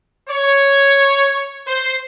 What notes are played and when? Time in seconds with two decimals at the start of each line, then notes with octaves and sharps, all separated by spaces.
0.29 C#5
1.67 C5